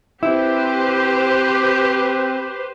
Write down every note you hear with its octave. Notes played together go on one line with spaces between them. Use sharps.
C4 E4 G4 B4 C5